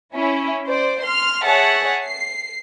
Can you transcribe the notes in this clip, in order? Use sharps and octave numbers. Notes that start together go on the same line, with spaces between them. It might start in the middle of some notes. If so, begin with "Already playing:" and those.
C#4 E4
C5 D5
C6 F6
G#4 C#5 E5 F#5 A5
C7